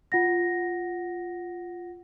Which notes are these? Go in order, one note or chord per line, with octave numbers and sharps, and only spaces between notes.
F4 F#5 A#6